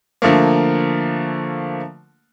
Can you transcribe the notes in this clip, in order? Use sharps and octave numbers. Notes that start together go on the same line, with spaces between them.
D3 F3 A3 A#3